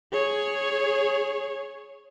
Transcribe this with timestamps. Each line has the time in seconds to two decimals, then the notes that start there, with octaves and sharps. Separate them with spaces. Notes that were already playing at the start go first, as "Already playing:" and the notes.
0.12 G#4 C#5